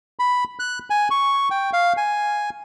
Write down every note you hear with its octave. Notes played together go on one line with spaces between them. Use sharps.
B5
F#6
G#5
C#6
G5
F5
G#5